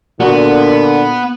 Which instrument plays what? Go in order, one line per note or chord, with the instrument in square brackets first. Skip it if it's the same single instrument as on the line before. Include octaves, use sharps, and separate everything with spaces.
[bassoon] A#2 [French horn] D3 [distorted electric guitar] B3 [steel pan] F#4